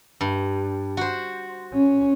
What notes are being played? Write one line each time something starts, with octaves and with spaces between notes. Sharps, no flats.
G2
F#4 C5
C#4